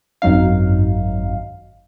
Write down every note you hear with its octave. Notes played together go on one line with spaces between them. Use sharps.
G#1 F#2 F#3 D#4 F5